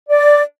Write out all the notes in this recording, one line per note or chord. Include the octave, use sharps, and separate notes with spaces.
D5